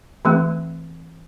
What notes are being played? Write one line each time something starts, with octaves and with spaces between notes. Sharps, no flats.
E3 A3 C4